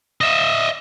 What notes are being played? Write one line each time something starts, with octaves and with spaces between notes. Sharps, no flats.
D#5 E5